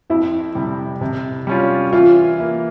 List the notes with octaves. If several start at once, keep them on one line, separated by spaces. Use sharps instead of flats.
F2 E4
C3 G3
C3
G3 C#4 F4
E3 F4
A#3 E4